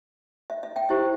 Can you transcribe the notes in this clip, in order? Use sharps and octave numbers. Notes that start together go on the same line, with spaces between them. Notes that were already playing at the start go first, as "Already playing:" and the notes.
E5
E5
E5 G5
E4 G4 C5 E5